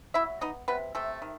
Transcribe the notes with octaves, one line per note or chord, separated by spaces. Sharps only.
F#3 E4 E5
B3 D#4 D#5
C3 B3 B4
C3 A3 A4
D#3